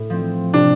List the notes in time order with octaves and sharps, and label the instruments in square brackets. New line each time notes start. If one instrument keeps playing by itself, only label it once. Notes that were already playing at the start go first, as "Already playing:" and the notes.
Already playing: [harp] A2
F3 C4
[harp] C3 [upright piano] D4